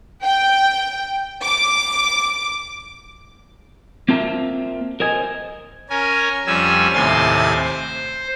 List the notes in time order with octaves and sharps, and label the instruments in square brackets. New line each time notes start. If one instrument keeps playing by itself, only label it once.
[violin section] G5
D6
[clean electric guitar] A#3 C4 F4 A#4 E5 A5
A#4 C5 D#5 G#5
[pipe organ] C#4 A#4 G#5
F2 G3 C#4 G#5 E6
D#2 A2 C3 G#5 C6 A6
C5